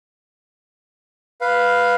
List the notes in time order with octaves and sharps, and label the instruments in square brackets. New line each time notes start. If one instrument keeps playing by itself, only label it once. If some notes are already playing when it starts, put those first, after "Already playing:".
[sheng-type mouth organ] B4 F5